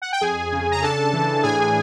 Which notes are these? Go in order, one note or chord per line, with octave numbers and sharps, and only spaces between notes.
F#5
G5
F2 G#4 G#5
C#3
A#5
D4 A4 A5
E3
A2 G#4 G#5